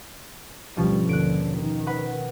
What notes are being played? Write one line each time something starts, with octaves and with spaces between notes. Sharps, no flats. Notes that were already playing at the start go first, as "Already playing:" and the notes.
G1 D2 B2 F3 G3 C#4
D#2 D3 F#6 D7
D#3
B4 F#5 B5